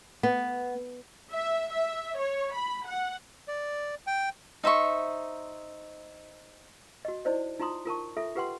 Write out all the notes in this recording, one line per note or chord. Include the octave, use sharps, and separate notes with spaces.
B3
E5
E5
C#5
B5
F#5
D5
G5
D#4 C5 E5 C#6
F#4 D#5
D#4 E4 C5 D5 D#5
D#4 F4 A#5 C6 D#6
F4 A#4 A5 C#6
F4 A4 E5
F4 G4 B4 F#5 G5 C6